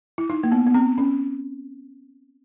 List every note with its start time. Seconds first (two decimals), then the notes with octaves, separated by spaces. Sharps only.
0.18 E4
0.30 D#4
0.43 A#3
0.52 B3
0.67 B3
0.75 C4
0.98 C#4